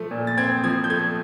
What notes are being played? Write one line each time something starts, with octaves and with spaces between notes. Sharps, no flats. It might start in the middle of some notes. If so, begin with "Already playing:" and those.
Already playing: F3 A3
A#2
A6
C4 G#6
F3 G#6
G6
A3 G#6